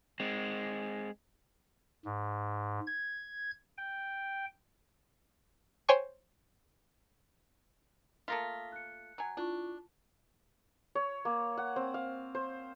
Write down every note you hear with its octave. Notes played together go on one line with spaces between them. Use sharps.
G#3 C4
G#2
G#6
G5
C5 C#5 G5 G#5 C#6
A3 A#3 F4 D#6 A#6 B6
F#6 C#7
F#3 G#5
D4 E4 F4 C#6
C#5
A#3
F#5
C4
F5
C5